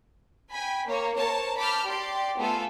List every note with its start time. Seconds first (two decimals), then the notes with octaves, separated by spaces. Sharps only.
0.50 G5 G#5 B5
0.86 A#3 C#5
1.17 A#4 C5 C#5 A5
1.56 A5 B5 D6 F6 G6
1.86 G4 D5 C6
2.38 A3 B3 F4 A4 G#5